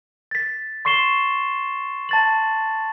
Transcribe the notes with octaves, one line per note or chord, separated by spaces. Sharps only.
A6 B6
C6 C#6 C7 E7 G7
A5 A6 F#7